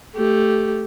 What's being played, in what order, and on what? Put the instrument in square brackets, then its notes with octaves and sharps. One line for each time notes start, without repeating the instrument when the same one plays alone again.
[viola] A3 G4